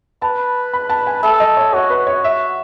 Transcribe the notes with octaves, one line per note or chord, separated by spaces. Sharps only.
B4 A5
B5
A5
G#5
A4 E5
D#5
C#5
F#4 C#5
B4
C#5
E5